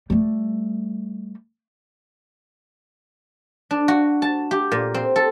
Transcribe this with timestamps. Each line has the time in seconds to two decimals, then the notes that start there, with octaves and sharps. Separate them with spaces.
0.10 G3 A3
3.71 D4
3.88 F#4
4.22 A5
4.51 G4
4.72 A#2
4.94 C4
5.16 A4